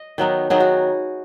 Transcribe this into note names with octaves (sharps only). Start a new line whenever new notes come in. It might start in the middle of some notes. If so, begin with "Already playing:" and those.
Already playing: D#5
D#3 F#3 B3 D#4
D#3 F#3 B3 D#4 G#4
F#4